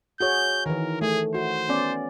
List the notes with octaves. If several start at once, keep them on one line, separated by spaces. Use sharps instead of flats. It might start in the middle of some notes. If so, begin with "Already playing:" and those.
F#4 G#4 C#5 G6
D#3 E3 A#4
A3 G#4
F#4 C5
B3 C#4 D5